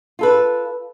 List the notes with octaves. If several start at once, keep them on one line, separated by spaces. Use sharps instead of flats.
F4 A4 B4